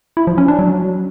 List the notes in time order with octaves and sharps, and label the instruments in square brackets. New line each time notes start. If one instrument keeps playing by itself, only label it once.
[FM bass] E4
F3
C#4
D4
F#3